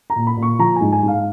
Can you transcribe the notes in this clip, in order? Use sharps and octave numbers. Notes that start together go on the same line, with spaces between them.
A#5
A#2
B5
A#2
C#6
F3 A#5
G#2 G#5
G#5
G#2
F5